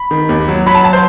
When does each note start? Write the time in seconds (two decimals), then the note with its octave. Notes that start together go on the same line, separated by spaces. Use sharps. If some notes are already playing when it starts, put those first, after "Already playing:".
Already playing: B5
0.11 D#3
0.29 D#2
0.48 F#3
0.66 F#3 B5
0.75 A5
0.85 A5
0.93 C5